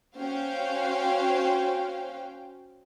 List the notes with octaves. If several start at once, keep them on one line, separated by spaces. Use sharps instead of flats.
C#4 F#4 C5 F5 G5